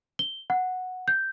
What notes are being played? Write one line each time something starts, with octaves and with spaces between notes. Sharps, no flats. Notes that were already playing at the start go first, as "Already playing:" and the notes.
G7
F#5
G6